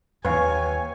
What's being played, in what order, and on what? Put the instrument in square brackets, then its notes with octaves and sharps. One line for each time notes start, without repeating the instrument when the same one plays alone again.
[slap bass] D#2 [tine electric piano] B4 F5 [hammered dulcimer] C#5 C#6 [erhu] G#5